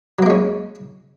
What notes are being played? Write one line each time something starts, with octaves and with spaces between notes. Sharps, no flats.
F#3 G#3 A#3 C#4